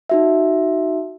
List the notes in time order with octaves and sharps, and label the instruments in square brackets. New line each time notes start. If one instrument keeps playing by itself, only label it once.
[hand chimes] D#4 F#4 E5